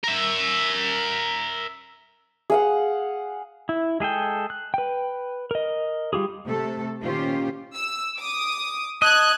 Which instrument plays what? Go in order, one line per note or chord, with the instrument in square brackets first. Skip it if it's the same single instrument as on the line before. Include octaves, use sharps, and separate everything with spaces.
[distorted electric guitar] A#4 E5
[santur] G#4 F5 F#5
[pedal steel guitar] E4
G#3 G#4 A4 G5
F#6
B4 G5
A#4 D#5
G3 F4 G4 G#4
[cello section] C3 A3 A4
A#2 D#3 C#4 F4 G4 C5
[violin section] E6
D6 D#6
[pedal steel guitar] D#5 [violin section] A5 F#6 G#6